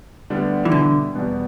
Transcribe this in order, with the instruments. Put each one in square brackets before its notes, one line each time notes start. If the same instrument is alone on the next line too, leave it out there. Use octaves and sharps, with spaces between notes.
[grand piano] D2 D3 G3 B3 D4
[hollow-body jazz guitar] E3
[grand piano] B2 G3 E4 [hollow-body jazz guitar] D3
[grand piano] E2 B2 G3 B3